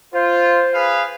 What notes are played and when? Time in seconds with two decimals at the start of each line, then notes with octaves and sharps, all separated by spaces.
0.14 F4 C5
0.74 G#4 B4 F5